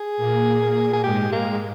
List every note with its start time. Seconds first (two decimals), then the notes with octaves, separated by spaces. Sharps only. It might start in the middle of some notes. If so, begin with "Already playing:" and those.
Already playing: G#4
0.17 A#2 A#3
0.45 A#2 A#3
0.93 G#4
1.02 G#2 G#3 G4
1.31 G#2 G#3 A#3